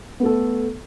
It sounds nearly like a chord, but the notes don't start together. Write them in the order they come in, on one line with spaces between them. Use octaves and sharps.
B3 A3 A4